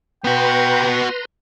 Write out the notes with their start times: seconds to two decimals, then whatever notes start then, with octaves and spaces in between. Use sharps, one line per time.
0.24 B3 F#4 B4 G5 A#5 C6